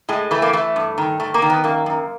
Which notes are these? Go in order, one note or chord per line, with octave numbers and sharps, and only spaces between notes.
A2 G#3
E3 A3
A#3
E3 A3
G2
D#3
D#3 A3
A#3
D#3
B3
F#2 A#3
F#2